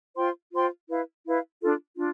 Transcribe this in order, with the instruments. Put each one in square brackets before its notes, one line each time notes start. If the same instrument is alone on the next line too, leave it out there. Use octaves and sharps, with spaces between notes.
[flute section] F4 C5 G5 C6
F4 C5 G5 C6
E4 B4 F5
E4 B4 F5
D4 F4 A4
D4 F4